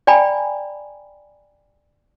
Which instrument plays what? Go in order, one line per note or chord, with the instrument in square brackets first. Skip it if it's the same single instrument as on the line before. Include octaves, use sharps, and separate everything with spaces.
[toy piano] D5 G5 G#5 A#5 B5